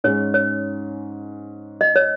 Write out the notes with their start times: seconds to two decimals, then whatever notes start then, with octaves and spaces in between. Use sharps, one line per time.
0.04 G#2 G#3 C#4 C#5
0.34 C#5
1.81 D#5
1.96 C#5